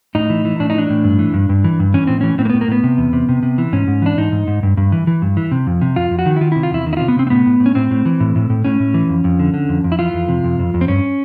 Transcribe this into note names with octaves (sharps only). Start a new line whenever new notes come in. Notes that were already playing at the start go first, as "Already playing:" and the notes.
A2 D#4
E3
E3
A2 D4
D#4
E3 D4
A2
G2
E3
G2
G2
E3
G2
E3 C#4
A2 C4
E3 C#4
A2 C4
A#3
A2 B3
A#3
A2 B3
C3
E2
C3
C3
C3
E3
G#2 C#4
G#2
E3 D4
G#2 D#4
G#2
G#2
G2
G2
E3
E3
G2
E3
C3
F2
C3
F2 F4
F2
F#4
D#3
E4
D#3 F4
C3 E4
F4
E2 E4
D#3
E4
C3 F4
B3
C3 C4
C4
A2 B3
A2
A2
C#4
A2 C4
A2
E3
A2
A2
A2
A2 C#4
A2
E3
F2
F2
D3
D3
F2
F2
E4
E3 F4
F2
C3
F2
F2
F2
C4
G2 C#4